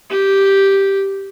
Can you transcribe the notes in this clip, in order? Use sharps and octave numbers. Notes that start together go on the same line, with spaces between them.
G4